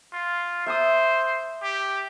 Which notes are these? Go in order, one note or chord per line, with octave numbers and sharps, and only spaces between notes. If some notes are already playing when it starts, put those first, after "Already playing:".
F4
C5 E5 A#5 D#6
G4